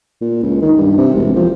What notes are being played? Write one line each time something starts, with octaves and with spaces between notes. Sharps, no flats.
A#2
C#2
D#3
G2
C3
E1
F3